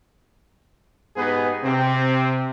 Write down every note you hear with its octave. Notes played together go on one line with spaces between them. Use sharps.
G#2 B3 D#4 G4 G#4 B4
C3 C4